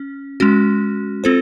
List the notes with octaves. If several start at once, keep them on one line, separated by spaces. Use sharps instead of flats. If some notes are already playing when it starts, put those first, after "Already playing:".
Already playing: C#4
G#3 C#4 F#4
C4 F4 A4 C5